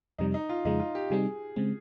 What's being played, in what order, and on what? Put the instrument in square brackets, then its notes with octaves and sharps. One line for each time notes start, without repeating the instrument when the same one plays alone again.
[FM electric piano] F2 C3 G3 [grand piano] D#4
[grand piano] D#4
F4
[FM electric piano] F2 C#3 G#3 [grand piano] D#4
[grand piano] F4
G4
[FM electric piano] C3 G3 C4 D#4 [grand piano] G#4
[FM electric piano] C#3 G#3 C4